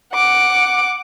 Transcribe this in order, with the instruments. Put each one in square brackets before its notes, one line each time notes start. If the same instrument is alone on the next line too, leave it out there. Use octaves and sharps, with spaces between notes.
[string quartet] F#5 D6